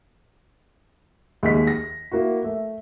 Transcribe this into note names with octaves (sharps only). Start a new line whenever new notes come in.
D#2 G#3 B6
A#6
A#3 E4 F#4
A3